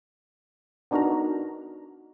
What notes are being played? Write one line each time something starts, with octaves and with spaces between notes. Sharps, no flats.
B3 D4 D#4 F#4 A#4 A#5